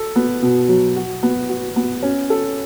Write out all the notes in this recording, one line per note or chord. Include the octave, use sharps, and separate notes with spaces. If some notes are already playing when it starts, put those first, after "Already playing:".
Already playing: A4
B3
B2
F#3
F#4
B3
F#4
B3
C#4
A4